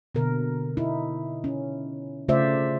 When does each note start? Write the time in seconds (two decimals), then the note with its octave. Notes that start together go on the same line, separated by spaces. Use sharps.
0.15 B2 D3 A#4
0.77 D#4 E4
1.44 C#4
2.28 C#3 A3 F4 C5 D5 E5